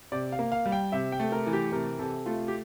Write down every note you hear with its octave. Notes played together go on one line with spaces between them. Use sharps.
C3 D5
F5
A#3
F5
G3
G5
C3 E5
G5
A3
A#4
E3
G4
C3 A#4
C3 A4
A3 F4
G4